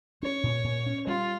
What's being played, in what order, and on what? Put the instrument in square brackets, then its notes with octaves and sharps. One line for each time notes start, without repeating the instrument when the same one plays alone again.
[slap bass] C#4 [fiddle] C#5
[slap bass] A#2
A#2
C#4
[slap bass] G3 [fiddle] F4